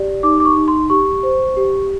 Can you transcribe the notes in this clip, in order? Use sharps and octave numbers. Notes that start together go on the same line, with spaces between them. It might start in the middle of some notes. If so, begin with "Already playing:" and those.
Already playing: G4 D5
D#4 D6
D6
C#6
D#4
C6
G4 C#6
C5
G4